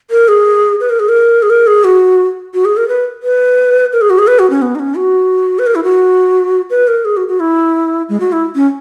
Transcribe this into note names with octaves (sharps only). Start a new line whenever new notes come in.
A#4
G#4
B4
A#4
G#4
A#4
G#4
A#4
G#4
F#4
F#4
G#4
A#4
B4
B4
A#4
G#4
F#4
G#4
B4
F#4
C#4
B3
D#4
C#4
F#4
B4
A#4
E4
F#4
B4
A#4
G#4
F#4
F#4
E4
G#3
F#4
E4
C#4